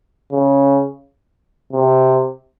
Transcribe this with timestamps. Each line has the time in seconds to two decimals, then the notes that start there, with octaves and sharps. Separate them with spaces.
0.32 C#3
1.73 C3